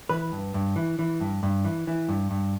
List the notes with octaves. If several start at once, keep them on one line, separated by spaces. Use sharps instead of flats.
E3 B4
G2
G2
E3
E3
G2
G2
E3
E3
G2
G2